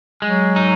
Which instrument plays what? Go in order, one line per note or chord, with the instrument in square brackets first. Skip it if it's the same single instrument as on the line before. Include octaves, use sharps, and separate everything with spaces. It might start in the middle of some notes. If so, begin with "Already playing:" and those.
[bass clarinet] F#3 [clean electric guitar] G#3
[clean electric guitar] D#4